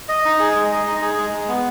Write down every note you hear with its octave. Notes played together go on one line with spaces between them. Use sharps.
D#5
D#4
G#4
G#3
D#5
D#4
G#4
G#3
G#3
B3